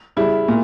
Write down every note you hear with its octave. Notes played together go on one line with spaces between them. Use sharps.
C#3 G3 E4
A#2